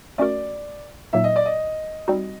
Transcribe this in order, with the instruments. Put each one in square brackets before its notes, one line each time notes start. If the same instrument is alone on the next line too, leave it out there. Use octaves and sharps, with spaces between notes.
[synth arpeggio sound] A3 C#4 F#4 A#4 [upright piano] D5
[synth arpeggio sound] A#2 F#3 A#3 D#4 [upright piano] E5
[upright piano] D#5
D5
D#5
[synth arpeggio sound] G3 C4 D#4 F#4